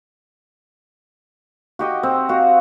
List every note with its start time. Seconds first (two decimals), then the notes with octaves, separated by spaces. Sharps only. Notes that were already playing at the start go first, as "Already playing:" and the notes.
1.79 F#4 G4 D#5
2.03 C4
2.29 F#4 D#5 F5